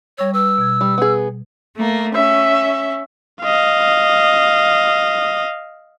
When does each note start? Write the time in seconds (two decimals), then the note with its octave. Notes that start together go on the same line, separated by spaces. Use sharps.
0.18 G3 C#5 C#6 E6
0.34 B4 E6
0.58 B2 G#6
0.81 G3
0.98 B3 G#4
1.77 A3 A#3
2.15 C#4 E5
3.42 D#5 F5